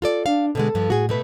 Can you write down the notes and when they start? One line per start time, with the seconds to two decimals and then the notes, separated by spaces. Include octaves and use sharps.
0.02 F4 A4 D5
0.26 D4 F5
0.55 B2 D3 G#3 A4
0.75 G2 F3
0.90 A2 F#4 G#4
1.09 B2 A3 B4